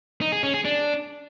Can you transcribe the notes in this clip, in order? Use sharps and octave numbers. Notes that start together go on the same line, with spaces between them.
D#4
G#4
C#4
G#4
D4